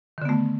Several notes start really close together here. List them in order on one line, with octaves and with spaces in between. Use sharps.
D#3 D3 B3 A3